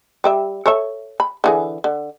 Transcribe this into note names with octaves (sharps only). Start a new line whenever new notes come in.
G3 D5 E5
A4 C#5 E5
B5
D3 E3 G#4
D3